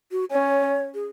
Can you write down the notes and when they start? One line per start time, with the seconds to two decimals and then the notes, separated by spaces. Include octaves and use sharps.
0.12 F#4
0.31 C#4 C#5
0.94 G#4